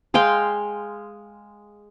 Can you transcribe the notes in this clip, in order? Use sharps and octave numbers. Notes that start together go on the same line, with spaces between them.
G#3 F5 G5 C6